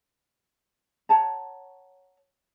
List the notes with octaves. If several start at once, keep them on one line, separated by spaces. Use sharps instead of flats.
C#5 F#5 A5 A#5